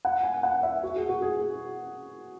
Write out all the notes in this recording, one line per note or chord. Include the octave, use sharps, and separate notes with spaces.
F#5
G#5
F#5
E5
F#4
G#4
F#4
G#4